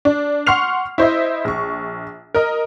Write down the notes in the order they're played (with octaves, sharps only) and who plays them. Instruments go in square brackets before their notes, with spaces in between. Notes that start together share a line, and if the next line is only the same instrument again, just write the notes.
[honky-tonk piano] D4
F#5 C6 C#6 F6 C7 F7
E4 C5 D#5 E5
A#1 C#6
A#4 D#5